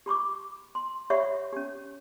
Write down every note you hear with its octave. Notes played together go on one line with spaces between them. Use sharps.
G4 B5 C#6 D6
C6
G4 C#5 E5 F#5 B5 C#6
C#4 G4